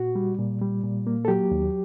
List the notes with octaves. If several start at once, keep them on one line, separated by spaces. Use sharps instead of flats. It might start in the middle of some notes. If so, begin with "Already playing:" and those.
Already playing: A#2 F#4
G3
A#2
G3
A#2
A#3
A4
F#3 G4
D#2